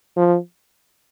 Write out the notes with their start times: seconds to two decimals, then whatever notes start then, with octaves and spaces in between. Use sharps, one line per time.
0.17 F3